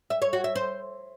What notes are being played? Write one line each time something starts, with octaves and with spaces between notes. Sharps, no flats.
E5
C#5
F#4
E5
C5